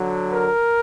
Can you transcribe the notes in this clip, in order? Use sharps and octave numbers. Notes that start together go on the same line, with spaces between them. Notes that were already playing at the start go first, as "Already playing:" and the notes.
Already playing: D3 F#3
A#4